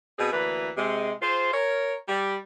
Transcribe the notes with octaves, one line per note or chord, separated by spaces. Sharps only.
B2 C4 G#4
D2 E3 A#3 B4
C3 G#3
F4 G#4 C5
A#4 C#5
G3